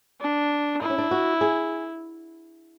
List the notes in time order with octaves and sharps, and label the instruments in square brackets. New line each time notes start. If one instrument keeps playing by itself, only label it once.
[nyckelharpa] D4
[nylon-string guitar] D4 [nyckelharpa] E4
[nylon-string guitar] C#4
D4
F#4
G#4